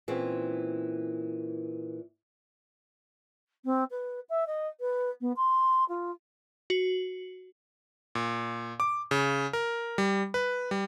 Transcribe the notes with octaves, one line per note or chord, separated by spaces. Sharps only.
A#2 E3 C4 C#4
C4
B4
E5
D#5
B4
B3
C6
F4
F#4
A#2
D6
C#3
A#4
G3
B4
G3